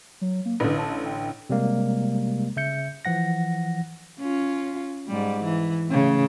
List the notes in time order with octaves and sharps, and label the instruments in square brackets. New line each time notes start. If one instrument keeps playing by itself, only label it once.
[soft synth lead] F#3
A#3
[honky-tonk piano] A1 D3 [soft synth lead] B4
[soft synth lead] A5
G5
[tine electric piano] C3 G3 G#3 A#3
C#3 E5 G6 C#7
E3 F3 F#5 A#6
[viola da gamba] C#4 F4
G#2 G3
E3
A2 C#3